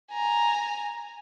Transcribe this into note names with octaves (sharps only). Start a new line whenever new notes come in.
G#5 A#5